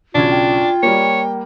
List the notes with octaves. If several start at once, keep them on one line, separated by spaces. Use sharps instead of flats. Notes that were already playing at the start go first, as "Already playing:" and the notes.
B1 C#3 D4 F4 G#6
G5
G3 A#3 C#5